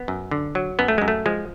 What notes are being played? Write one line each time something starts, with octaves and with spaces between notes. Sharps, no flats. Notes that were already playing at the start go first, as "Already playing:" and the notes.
Already playing: B3
F#2
D3
F#3
F#2 B3
A3
F#2 G#3
A3
F3 G#3